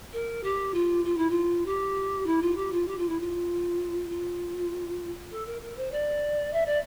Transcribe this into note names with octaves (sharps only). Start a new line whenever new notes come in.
A#4
G4
F4
F4
E4
F4
G4
E4
F4
G4
F4
G4
F4
E4
F4
F4
A4
A#4
A#4
C5
D5
E5
D5